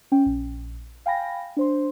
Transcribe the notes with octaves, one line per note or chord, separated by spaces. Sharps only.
C#4 G5
A#1
F5 G5 G#5 B5 A#6
D4 C5 C6